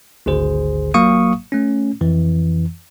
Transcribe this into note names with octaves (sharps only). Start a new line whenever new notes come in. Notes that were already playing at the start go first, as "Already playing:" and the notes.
G#1 D2 D3 G#4 C5
G1 F#3 A#3 F5 C#6 D#6
A3 C#4
F2 E3